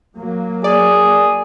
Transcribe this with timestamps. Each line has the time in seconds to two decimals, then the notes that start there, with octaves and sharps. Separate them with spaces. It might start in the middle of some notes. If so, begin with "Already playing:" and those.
0.18 F#3 A#3
0.64 G#4 D5